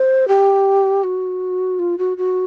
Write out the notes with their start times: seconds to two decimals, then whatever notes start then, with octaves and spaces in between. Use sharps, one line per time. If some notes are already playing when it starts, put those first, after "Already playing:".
Already playing: C5
0.28 G4
1.04 F#4
1.79 F4
1.98 F#4
2.17 F#4